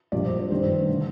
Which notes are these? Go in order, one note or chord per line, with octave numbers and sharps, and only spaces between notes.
A#1 A#2 G3 A#3 D5
C5
C5
G2 D#3 A3 C5
D3 A3